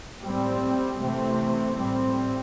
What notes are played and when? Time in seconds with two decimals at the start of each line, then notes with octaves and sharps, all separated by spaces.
0.22 A2 G3 C4
1.00 C3 E3 A3 C4
1.79 A2 G3 C4